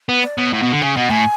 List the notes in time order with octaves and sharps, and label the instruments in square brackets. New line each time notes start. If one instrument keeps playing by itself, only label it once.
[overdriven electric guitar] B3
[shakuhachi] D5
[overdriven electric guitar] B2 [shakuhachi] C#5
[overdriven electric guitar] A2 [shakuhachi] F#5
[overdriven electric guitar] B2
D3
[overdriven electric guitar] C#3 [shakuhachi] G#5
[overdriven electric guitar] B2 [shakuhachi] F#5
[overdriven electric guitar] A2 [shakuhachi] G#5